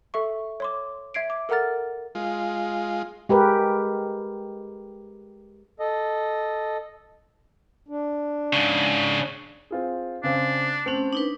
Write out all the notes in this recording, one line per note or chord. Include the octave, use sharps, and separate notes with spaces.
A4 E5 C#6
C#5 C6 D6
E5 G#6 C7 D7
D6
A4 A#4 F#5 A#5 F6 A6
G#3 F4
G#3 G4 A#4 B4
A4 D#5
D4
G#2 C#3
C4 F4 G#4
C#3 C4 D4
A3 C4 C#4 F#7
D4 D#4 B4